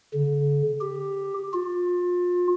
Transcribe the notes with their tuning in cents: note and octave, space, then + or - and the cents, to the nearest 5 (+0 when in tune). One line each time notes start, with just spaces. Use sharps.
D3 -45
G4 +5
F4 +30